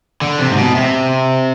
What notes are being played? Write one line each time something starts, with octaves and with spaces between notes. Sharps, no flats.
D3
C3
G#2
B2
C3